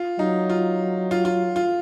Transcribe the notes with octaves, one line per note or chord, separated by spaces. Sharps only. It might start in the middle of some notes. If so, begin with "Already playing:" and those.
Already playing: F4
F#3 D#4
F4
F4
F4
F4